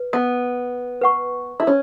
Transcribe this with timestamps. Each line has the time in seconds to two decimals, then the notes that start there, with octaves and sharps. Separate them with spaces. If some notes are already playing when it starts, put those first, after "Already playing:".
Already playing: B4
0.13 B3
1.01 B4 F#5 C#6
1.60 E4
1.67 C#4